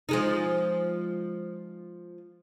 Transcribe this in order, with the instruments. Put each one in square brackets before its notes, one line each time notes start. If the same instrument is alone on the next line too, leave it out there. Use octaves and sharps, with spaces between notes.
[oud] F3 G#3 D#4